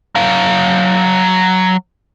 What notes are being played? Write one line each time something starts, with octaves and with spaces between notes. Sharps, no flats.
F#3 F5